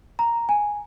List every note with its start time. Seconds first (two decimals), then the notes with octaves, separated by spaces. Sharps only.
0.19 A#5
0.49 G#5